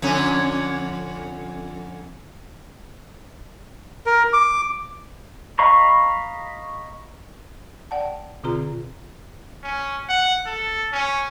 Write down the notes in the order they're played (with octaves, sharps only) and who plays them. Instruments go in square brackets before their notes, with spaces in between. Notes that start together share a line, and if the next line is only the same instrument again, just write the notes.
[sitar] F2 D3 C#4
[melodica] A#4
D6
[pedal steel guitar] D#5 F5 A#5 B5 C#6
[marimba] D5 F#5 G5 A5
B2 D3 C4 F4 G#4 A#5
[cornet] C#4
F#5
A4
C#4